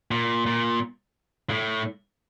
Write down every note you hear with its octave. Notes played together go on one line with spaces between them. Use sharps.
A#2
A#2
A2